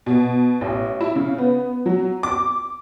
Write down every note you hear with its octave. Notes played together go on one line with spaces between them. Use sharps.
B2
A1
E4
C#3
B3
F#3
D6